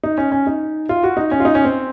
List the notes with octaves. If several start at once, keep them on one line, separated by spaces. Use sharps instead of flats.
D#4
C#4
C#4
D#4
F4
F#4
D#4
C#4
F4
D#4
C#4
C4